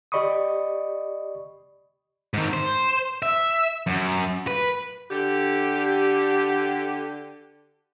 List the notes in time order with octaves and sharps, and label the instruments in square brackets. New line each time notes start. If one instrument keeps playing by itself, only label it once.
[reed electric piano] G4 D5 D#5 B5 C#6 D#6
[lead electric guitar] G#2 D#3
C5
E5
F#2
B4
[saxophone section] D3 G4